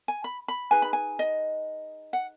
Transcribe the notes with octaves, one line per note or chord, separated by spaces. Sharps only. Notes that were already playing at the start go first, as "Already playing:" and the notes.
G#5
B5
B5
D#4 G#4 B4 G#5
B5
G#5
D#5
F#5